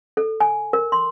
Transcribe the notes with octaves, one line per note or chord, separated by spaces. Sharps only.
A4
G#5
A#4
C6